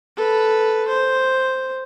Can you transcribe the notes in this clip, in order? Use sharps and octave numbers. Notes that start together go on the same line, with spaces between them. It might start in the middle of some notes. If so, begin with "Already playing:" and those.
A4 B4
C5